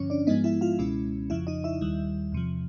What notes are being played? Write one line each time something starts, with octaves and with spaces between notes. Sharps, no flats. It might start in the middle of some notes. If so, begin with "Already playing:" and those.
Already playing: G2 D3 F3 C#4 C#5
D4 D5
G#2 F3 G#3 B3 D#4 D#5
E4 E5
F4 F5
C#2 B2 G#3 C#4 E4
F2 C#3 F3 E4 E5
D#4 D#5
E4 E5
D#2 D#3 G3
E2 C3 F3